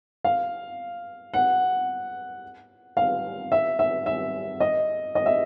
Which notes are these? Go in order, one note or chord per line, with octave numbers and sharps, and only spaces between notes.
F5
F#5
F5
E5
E5
E5
D#5
D#5
E5